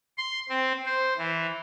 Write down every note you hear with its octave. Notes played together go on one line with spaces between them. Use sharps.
C6
C4
C5
E3